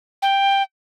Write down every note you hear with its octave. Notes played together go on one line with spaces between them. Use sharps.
G5